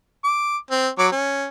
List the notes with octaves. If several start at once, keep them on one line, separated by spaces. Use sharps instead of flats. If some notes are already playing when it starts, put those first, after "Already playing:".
D6
C4
F#3 C#5 D6
C#4